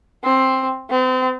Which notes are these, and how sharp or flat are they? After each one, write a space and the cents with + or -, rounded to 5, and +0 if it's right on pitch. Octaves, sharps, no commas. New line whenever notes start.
C4 +10
C4 -35